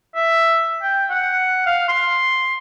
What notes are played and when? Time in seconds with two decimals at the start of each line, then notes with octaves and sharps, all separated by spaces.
0.16 E5
0.82 G5
1.10 F#5
1.66 F5
1.88 C6